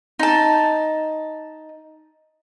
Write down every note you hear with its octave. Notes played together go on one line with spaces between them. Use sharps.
D#4 A5